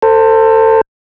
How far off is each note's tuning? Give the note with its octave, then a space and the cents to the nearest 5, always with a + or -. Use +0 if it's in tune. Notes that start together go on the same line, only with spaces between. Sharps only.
A4 +25 C5 +0